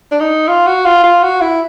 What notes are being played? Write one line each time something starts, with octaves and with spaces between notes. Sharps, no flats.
D4
D#4
F4
F#4
F4
F4
F#4
E4